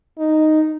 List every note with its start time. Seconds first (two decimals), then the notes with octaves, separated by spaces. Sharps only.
0.19 D#4